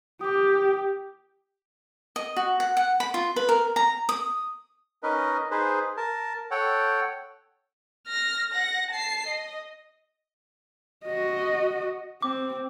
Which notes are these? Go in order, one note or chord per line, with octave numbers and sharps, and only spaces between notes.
G4 D6 D#6
D#5
F#4
F#5
F#5
B5
F4
B4
A#4
A#5
D#6
C#4 D#4 A#4 B4 D#5
D#4 G#4 B4 C5
A#4 A5
A4 C#5 F#5 G5
F6 A#6
F#5 A#6
A5 C7
D#5
F#4 D#5
C4 D6